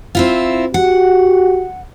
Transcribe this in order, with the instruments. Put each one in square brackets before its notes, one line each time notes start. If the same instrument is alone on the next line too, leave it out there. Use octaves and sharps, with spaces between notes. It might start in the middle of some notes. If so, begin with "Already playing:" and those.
[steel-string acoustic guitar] C4 E4 F4
[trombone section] F#4 G4 [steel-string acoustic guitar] F#5